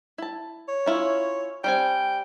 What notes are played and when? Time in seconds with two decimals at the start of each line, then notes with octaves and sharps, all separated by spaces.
0.18 E4 A5
0.68 C#5
0.86 C#4 E4 F4
1.64 G3 C4 G5 G#5